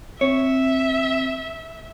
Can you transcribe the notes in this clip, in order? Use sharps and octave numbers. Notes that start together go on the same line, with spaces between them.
C4 C#5 E5